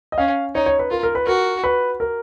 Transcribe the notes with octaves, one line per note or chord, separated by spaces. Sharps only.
D#5
C#4 F5
D#4 C#5
C#5
B4
F4 A#4
A#4
B4
F#4 A#4
B4
A#4